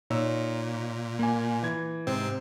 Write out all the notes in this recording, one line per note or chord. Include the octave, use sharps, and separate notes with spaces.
A#2 D#4 C#5 E6
A#3 G#5
E3 G#6
G#2 C3 C4